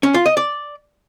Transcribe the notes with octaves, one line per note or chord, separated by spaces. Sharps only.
C#4
F4
D#5
D5